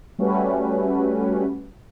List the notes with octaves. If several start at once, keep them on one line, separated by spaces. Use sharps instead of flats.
G3 A3 C#4 F#4 G4 B4